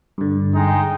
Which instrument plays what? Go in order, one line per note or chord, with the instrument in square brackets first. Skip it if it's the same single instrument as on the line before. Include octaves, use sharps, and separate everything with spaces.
[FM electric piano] G2 D3
[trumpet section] G#3 D#4 G5